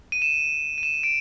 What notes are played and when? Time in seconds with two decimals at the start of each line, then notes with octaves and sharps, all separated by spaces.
0.12 D#7
0.22 E7
0.78 D#7
0.83 E7
0.94 D#7
1.03 D7